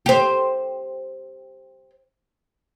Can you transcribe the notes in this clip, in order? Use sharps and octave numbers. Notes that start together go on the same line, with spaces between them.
G4 C5